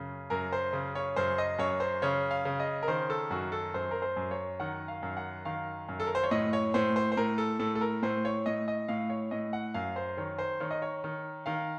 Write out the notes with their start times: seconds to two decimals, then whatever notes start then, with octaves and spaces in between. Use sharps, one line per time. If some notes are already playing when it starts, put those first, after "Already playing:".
Already playing: F#2 C#3
0.30 F#2 A#4
0.52 C5
0.73 C#3
0.95 C#5
1.16 F#2 C5
1.38 D#5
1.59 F#2 C#5
1.80 C5
2.02 C#3 C#5
2.31 F5
2.45 C#3
2.60 D#5
2.83 A#4
2.88 D#3 C5
3.10 A4
3.30 F#2 F#4
3.52 A4
3.74 F#2 C5
3.91 A#4
4.02 C5
4.17 F#2
4.31 C#5
4.60 D#3 F#5
4.88 F5
5.03 F#2
5.17 F#5
5.45 D#3 F5
5.89 F#2
6.00 A4
6.07 A#4
6.15 C5
6.23 C#5
6.31 A2 D#5
6.53 C#5
6.74 A2 C5
6.96 C5
7.12 C5
7.17 A2 A#4
7.38 A4
7.59 A2 A4
7.75 A4
7.81 A#4
8.02 A2 C5
8.25 C#5
8.46 A2 D#5
8.68 D#5
8.88 A2 F5
9.10 C#5
9.31 A2 D#5
9.53 F#5
9.74 F#2 F5
9.96 C5
10.17 D#3 C#5
10.39 C5
10.60 D#3 C#5
10.71 D#5
10.82 C#5
11.04 D#3
11.46 D#3 F5